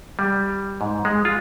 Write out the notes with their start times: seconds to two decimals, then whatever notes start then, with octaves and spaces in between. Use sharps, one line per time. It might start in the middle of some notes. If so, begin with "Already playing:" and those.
0.19 G3
0.81 G#2
1.05 G#3
1.25 F4